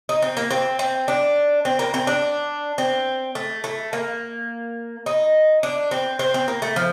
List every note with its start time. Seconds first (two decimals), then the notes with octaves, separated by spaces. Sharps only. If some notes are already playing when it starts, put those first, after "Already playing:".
0.09 D#4
0.22 C4
0.37 A#3
0.51 C4
0.79 C4
1.08 D4
1.65 C4
1.79 A#3
1.94 C4
2.07 D4
2.78 C4
3.35 A3
3.64 A3
3.93 A#3
5.06 D#4
5.63 D4
5.91 C4
6.19 C4
6.34 C4
6.48 A#3
6.62 A3
6.76 F3